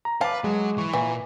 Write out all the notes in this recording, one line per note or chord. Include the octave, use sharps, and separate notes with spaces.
A#5
B4 C5 F5 A5 D6
F#3 G#3
E3 C#6
A#2 E3